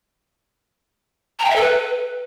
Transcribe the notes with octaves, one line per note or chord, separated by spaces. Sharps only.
A#5
G5
E5
A4
B4